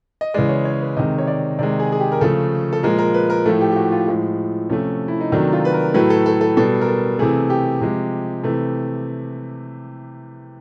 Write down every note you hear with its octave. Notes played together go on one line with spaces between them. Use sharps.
D#5
C#3 E3 G#3 D5
C#5
C#5
B4
C3 D#3 G#3 D#5
C#5
D5
C3 D#3 G#3 D5
G#4
G#4
G4
A#4
C#3 F3 A3 A4
A4
A#2 F3 G#3 A#4
A#4
B4
A#4
A2 F3 A3 A4
G4
G4
F#4
F4
A2 F3 G#3
C3 F3 A3 C#4
E4
D#4
C3 D#3 F#3 A3 D4
F4
B4
A#4
A2 F#3 A3 B4
A4
A4
A4
B2 G3 A4
A#4
A4
C3 E3 A3 G#4
G4
C3 F3 G#3
C3 E3 A3